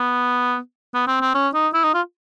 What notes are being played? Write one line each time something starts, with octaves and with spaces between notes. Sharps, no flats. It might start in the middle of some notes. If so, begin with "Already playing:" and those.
Already playing: B3
B3
C4
C4
C#4
D#4
E4
D#4
F4